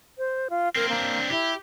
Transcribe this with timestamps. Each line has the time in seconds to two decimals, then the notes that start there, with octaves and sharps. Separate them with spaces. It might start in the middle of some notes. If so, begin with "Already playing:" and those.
0.18 C5
0.50 F4
0.76 A#3 C4 A#4
0.89 A#3 C4 D4
1.30 E4 G4